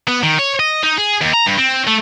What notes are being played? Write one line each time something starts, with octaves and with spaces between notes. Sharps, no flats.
B3
D#3
C#5
D#5
D#4
G#4
D#2
A#5
G2
C4
A3